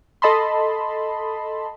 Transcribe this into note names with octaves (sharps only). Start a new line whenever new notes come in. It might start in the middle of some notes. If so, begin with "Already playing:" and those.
A4 D#5 A5 B5 C6